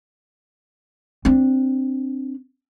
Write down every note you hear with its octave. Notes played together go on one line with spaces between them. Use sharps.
C4 D4